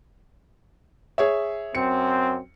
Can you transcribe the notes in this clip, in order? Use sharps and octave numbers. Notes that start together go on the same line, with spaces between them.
G#4 C#5 E5
F#2 C4 C#7